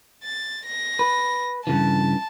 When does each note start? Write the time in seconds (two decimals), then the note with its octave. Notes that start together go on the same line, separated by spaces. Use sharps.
0.23 A6
0.66 A#6
0.99 B4
1.67 G2 C#3 E3 A5